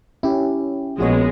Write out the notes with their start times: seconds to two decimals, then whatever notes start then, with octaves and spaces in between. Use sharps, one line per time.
0.23 C#4 E4 G4
0.98 A#1 F3 G#3 B3 F#4 C#5